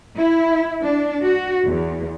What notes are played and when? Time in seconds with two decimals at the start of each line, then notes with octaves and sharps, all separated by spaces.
0.17 E4
0.83 D4
1.22 F#4
1.66 E2